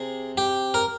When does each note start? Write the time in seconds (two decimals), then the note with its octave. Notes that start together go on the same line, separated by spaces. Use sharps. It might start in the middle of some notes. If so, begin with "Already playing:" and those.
Already playing: C3 G#4
0.37 G4
0.74 A#4